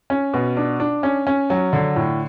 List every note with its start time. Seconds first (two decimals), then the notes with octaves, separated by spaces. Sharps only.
0.10 C#4
0.34 B2
0.57 D4
0.80 D4
1.03 C#4
1.27 C#4
1.50 F#3
1.73 D3
1.96 A2